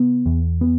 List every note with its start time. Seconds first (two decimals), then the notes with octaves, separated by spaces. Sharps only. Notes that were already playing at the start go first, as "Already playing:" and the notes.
Already playing: C3 B3
0.26 E2
0.61 B3